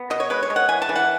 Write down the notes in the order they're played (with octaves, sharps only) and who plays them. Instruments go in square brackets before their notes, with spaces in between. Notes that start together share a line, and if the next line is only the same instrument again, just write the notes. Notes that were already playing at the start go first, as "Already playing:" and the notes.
Already playing: [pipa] B3
B2 D#5
C#5
G#3 B4
C#5
G#3
F#5
E3 G#5
A5
E3
F#5